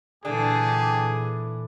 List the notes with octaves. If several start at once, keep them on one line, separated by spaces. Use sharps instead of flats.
A#2 D3 E3 G4 G#4 A5